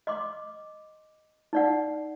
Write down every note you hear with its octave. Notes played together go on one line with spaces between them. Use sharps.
D#5 C6 D6
D#4 D5 F#5